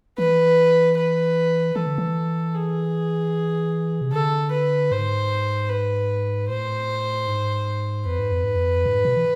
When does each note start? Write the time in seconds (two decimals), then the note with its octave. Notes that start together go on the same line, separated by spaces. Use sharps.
0.18 E3 B4
0.97 B4
1.75 E3 A4
1.87 D3
1.98 E3
2.54 G#4
4.01 C3
4.12 D3 A4
4.52 B4
4.91 G#2 C5
5.70 B4
6.49 A2 C5
7.27 G#2
8.06 F2 B4
8.19 G#2
8.32 F2
8.44 G#2
8.56 F2
8.86 G#2
9.05 B2
9.17 E3